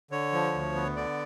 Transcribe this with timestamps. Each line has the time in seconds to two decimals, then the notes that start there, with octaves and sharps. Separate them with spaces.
0.11 D3 C#5
0.33 F3
0.53 D2
0.75 B3
0.96 D3 D5